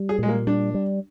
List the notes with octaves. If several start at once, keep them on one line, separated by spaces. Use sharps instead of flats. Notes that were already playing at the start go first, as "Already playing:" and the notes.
Already playing: G3
G#4
A#2 G#3
A#3
G3 D4
G3